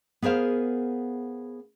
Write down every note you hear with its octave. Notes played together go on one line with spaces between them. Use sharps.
B3 G#4 A#4 C5 F5